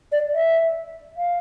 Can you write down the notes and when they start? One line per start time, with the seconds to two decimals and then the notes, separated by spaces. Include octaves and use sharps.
0.12 D5
0.34 E5
1.17 F5